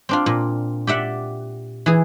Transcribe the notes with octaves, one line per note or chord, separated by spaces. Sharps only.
C4 D4 F4
A#2
G4 D5 E5 F#5
E3 G#4